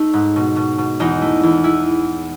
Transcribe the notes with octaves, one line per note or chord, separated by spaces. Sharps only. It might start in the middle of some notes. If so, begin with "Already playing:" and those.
Already playing: A3 D#4
G#2
B2
B2
B2
E2 D#4
A3
E2
E4